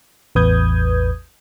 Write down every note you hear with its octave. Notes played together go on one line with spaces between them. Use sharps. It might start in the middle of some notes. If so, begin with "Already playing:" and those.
A1 E2 B4 D#6 G6 G#6